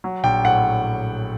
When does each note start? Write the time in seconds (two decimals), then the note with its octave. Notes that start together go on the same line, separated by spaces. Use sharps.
0.04 F#3
0.24 A#1 G5
0.45 A2 F#5